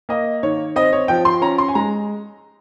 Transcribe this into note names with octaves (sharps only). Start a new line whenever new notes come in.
A#3 D#5
D#3 C#5
C4 D#5
C#5
F3 G5
C6
C#4 A#5
C6
G#5
G#3 A#5